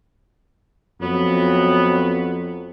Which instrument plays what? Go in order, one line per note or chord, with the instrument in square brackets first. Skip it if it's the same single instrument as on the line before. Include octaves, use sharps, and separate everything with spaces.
[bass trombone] F2 [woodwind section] F#3 B3